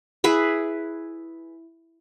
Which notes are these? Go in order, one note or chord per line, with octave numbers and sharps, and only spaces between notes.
E4 G#4 B4